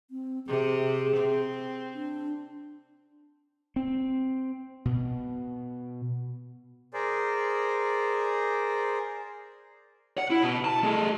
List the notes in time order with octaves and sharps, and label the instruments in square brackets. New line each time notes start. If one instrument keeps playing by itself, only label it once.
[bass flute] C4
[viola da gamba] C3 [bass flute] G#4
[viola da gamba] C4
[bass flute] D4
[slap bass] C4
B2
[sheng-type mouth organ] G#4 A#4 C5 D5
[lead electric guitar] F#5
E4
B2
A5
A3 G#4